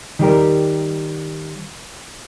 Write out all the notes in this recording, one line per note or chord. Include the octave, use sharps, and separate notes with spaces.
D#3 G3 G4 A#4